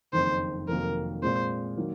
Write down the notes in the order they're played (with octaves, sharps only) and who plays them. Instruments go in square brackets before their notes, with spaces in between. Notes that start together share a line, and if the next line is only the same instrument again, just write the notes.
[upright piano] F#1 F2 D#3 [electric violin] C5
[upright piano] F1 F2 D#3 F#3 A#3 [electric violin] A#4
[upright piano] A#2 G#3 C4 [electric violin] C5
[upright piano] D#3 F#3 A#3